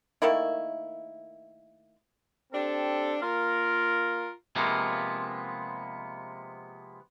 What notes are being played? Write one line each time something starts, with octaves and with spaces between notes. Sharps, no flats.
D#3 A3 A#3 E4
C4 D4 G4 A4
A#3 F4 A#4
C3 F3 G#3 A#3 B3